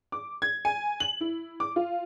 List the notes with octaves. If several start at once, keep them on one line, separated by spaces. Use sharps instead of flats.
D6
G#6
G#5
F#7
E4
D6
F4